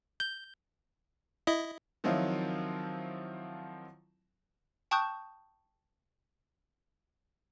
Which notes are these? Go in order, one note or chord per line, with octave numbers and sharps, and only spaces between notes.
G6
E4 D#5
D#3 F3 F#3 C4 E4 F4
G5 A5 C#6 D#6 F#6 G6